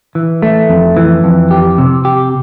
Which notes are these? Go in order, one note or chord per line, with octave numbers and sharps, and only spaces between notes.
E3
A3
F2
E3
F2
G4
C3
G4